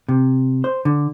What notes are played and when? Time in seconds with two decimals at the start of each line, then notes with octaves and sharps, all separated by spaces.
0.09 C3
0.64 C5
0.85 D3